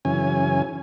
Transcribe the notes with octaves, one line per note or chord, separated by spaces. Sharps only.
F#2 C#3 E3 C#4 G#5